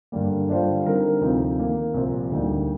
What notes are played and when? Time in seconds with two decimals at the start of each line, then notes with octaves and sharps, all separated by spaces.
0.12 G2 D3 G3 A#3
0.48 D3 G3 D4 F4 C5
0.85 D3 G3 C4 D#4 A#4
1.21 D2 C3 F3 C4 D#4
1.57 D#3 A#3 D#4
1.94 C2 A#2 F3 C4
2.30 D2 D3 G3 A#3 D#4